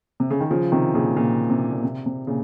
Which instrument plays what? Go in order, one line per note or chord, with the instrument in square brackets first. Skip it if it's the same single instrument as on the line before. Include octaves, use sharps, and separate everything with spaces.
[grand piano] C3
C#3
D#3
C#3 F3
C3 D#3
A#2 C#3
A#2 C#3
C3
A#2
C3
C3
A#2 C#3